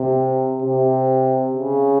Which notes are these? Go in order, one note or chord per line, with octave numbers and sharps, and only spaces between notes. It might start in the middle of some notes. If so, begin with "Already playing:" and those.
Already playing: C3
C3
C#3